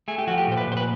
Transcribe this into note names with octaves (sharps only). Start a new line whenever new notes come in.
A3 G#4
G4
F3 F#4
G4
A#2 C5
B4
A#2 C5
B4